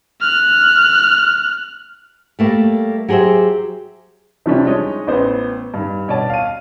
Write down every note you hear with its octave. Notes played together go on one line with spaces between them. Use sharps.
F6 F#6
G3 A3 A#3
F#3 G4 G#4 C5 E5
C3 E3 F3 G3 C#4 D4
G#3 D#4 C#5 D#5
A1 B3 C5
G2 D#3
B2 C#5 D5 A5
F5 D#7